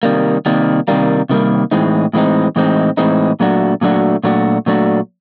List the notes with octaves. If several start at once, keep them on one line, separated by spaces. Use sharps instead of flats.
C3 D#3 G3 A#3
C3 D#3 G3 A#3
C3 D#3 G3 A#3
C3 D#3 G3 A#3
A2 E3 G#3 C4 D#4
A2 E3 G#3 C4 D#4
A2 E3 G#3 C4 D#4
A2 E3 G#3 C4 D#4
A#2 F#3 A3 D4 F#4
A#2 F#3 A3 D4 F#4
A#2 F#3 A3 D4 F#4
A#2 F#3 A3 D4 F#4